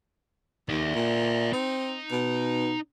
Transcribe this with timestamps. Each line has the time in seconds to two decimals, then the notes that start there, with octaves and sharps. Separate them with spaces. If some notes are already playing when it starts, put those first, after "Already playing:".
0.69 D#2 D5 E5
0.94 A#2
1.53 C4 D#4
2.11 B2